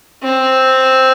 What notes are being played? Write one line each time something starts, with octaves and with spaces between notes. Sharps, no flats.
C4